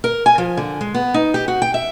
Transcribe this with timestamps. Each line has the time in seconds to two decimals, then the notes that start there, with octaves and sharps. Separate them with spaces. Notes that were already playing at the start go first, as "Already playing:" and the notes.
0.04 A#4
0.26 G#5
0.38 F3
0.57 D3
0.81 G#3
0.94 B3
1.14 D#4
1.34 G4
1.48 F#4
1.62 G5
1.74 E5